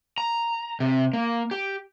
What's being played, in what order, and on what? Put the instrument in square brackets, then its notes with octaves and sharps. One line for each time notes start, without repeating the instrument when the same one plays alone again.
[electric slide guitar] A#5
C3
A#3
G4